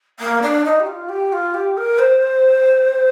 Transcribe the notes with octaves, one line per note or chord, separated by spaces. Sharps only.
A#3
D4
D#4
G4
F4
G4
F4
G4
A#4
C5